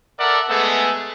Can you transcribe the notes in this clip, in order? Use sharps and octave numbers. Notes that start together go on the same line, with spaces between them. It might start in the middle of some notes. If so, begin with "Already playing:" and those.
A4 A#4 D5 E5 F#5
G#3 A3 B3 G#4 A4